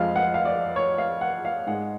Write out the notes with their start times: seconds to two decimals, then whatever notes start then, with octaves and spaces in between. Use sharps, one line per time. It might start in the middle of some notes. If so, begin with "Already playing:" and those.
Already playing: F2 F3 G#3 F5
0.16 F#5
0.34 F5
0.45 D5
0.76 C#5
0.98 F5
1.21 F#5
1.45 F5
1.67 G#2 G#3 F#5